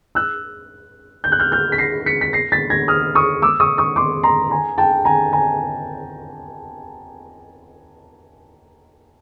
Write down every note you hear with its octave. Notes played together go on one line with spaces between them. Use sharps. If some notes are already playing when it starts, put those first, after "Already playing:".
E6 F#6
G6
F#6
F6 G6
F6 G6
B6
A#6 C7
B6 C#7
B6
A#6 C7
A6 B6
G#6 A#6
D#6 F6
C#6 D#6
D6 E6
C#6 D#6
C#6 D#6
C6 D6
A#5 C6
G#5 A#5
G5 A5
G#5 A#5
G#5 A#5